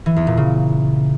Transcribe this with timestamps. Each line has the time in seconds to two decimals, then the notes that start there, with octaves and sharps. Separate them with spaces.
0.06 E3
0.16 E2
0.27 A#2
0.37 C#3